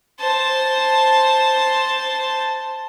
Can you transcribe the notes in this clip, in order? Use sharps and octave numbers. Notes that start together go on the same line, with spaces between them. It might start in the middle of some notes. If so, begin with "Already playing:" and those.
C5 A5